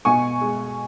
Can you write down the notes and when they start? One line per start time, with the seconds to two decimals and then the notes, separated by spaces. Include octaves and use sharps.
0.05 B2 G#5 C#6
0.41 G#3